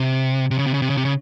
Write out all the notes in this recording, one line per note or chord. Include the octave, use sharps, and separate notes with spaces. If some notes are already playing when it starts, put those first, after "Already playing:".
Already playing: C3
C3
C#3
C3
C#3
C3
C#3
C3
C#3